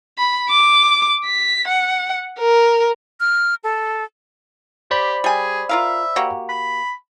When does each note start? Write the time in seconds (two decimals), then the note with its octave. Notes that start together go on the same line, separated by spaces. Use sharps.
0.18 B5
0.49 D6
1.25 B6
1.67 F#5
2.39 A#4
3.20 F6
3.64 A4
4.91 G4 C5 D5 B5
5.24 G3 G#4 G#5
5.69 F4 A#4 E5 F5
6.16 A#3 F#4 G4
6.49 B5